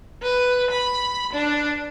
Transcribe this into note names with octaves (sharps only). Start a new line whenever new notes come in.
B4
B5
D4